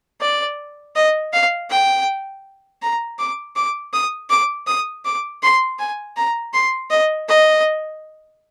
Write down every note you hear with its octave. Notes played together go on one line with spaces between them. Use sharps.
D5
D#5
F5
G5
A#5
D6
D6
D#6
D6
D#6
D6
C6
G#5
A#5
C6
D#5
D#5